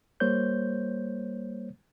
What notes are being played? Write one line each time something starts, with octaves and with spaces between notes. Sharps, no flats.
G3 A#3 C5 C#5 G6